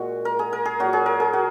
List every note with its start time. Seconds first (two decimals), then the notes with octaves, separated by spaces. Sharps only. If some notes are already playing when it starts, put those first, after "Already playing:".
Already playing: A#2 G#3 F#4
0.25 A#4
0.39 G#4
0.53 A#4
0.65 G#4
0.80 A#2 F#3 F#4
0.93 G#4
1.06 A#4
1.20 G#4
1.33 F#4